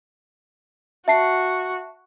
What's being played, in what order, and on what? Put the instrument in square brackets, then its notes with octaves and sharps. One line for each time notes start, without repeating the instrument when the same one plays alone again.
[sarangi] F#4 [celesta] E5 A5 C7